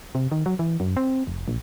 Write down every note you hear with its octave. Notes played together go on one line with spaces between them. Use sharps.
C3
D#3
F#3
E3
F#2
C4
F1
A#1